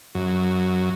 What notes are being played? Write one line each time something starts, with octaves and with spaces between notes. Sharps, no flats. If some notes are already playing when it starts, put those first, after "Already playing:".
F#2